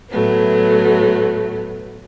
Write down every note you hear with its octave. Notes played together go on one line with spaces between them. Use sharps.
A2 F#3 A3 B3